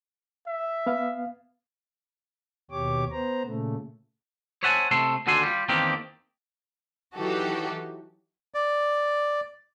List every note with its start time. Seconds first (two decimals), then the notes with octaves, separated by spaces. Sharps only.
0.47 E5
0.86 B3 F5
2.71 D#2 B2 G4 C#5 D6
3.12 B3 C5 A#5
3.45 A#2 C#3 A3
4.63 C5 C#5 E5 F#5 G#5 A5
4.91 C3 A3 A4 C6
5.27 D#2 D3 F#4 A4 G#5 C6
5.43 G3 F4
5.69 E2 D#3 A#3 C4 D4 G4
7.16 E3 F#3 D#4 F#4 G4 A4
8.54 D5